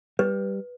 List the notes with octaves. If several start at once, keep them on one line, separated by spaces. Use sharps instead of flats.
G3 B4